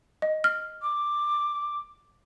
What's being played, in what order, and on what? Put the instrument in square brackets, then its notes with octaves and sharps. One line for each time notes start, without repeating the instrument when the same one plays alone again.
[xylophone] D#5
F6
[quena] D6